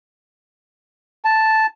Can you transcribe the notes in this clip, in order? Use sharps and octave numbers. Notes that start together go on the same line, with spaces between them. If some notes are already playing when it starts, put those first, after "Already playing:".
A5